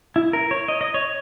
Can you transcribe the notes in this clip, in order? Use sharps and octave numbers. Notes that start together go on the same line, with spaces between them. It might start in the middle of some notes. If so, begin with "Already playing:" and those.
E4
A#4
C#5
D#5
D#5
C#5